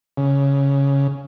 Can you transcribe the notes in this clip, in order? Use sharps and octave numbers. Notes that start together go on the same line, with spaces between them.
C#3